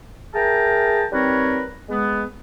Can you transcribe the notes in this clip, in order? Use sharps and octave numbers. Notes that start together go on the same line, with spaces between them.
G#4 A#4 E5 G5 A5 A#5
G3 C4 D#4 A#4 B4 C#5
G#3 B3